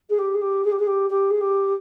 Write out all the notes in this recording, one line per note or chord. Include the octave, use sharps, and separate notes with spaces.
G#4
G4
G#4
G4
G#4
G4
G#4
G4
G4
G#4
G4